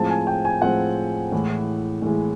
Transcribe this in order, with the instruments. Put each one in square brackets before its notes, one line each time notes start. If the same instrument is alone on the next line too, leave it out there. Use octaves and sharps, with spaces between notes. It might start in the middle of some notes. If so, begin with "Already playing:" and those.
Already playing: [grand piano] A2 F3 G#3 C4 A5
G#5
G5
G#5
A2 F3 G#3 C4 F#5
A2 E3 G#3
A2 E3 G#3